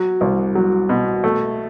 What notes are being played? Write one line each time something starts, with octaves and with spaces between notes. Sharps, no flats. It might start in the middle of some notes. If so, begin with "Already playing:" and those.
Already playing: F#3
C2
F#3
B2
A3